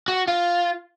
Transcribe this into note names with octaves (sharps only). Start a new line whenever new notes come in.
F#4
F4